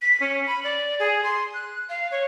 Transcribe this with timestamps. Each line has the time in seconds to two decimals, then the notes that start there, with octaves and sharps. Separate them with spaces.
0.02 B6
0.20 C#4
0.47 B5
0.64 D5
0.99 G#4
1.24 C6
1.54 F#6
1.89 F5
2.11 C#5